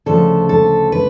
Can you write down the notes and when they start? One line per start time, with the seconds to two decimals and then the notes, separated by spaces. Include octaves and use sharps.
0.06 D2 C#3 F3 A4
0.49 A4
0.92 B4